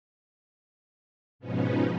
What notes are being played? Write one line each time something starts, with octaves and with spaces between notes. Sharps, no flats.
G#2 B2 F3 B3 C#4 D#4